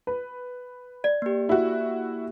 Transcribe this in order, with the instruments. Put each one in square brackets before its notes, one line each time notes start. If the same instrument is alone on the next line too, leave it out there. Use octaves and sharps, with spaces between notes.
[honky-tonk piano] B4
[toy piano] D5
[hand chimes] A#3 G4
[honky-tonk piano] E4 F#4